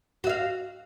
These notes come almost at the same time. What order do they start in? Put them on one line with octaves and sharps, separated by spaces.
F#4 E5 F5